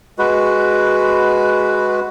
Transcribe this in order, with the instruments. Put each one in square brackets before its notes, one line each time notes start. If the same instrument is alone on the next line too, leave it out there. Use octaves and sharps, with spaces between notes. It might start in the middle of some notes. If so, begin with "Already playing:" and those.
[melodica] G#3 F#4 B4